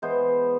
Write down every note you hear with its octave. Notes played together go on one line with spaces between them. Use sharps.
E3 G#3 B3 C5